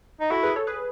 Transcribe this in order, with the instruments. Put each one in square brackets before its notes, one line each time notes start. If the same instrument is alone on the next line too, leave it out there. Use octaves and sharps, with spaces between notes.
[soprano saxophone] D#4
[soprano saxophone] E4 [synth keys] F#4 A4
[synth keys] G#4 B4
A4 C#5
G#4 B4